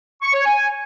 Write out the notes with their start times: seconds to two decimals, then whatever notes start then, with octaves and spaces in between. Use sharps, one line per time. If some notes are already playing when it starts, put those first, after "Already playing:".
0.22 C#6
0.33 C#5
0.45 G#5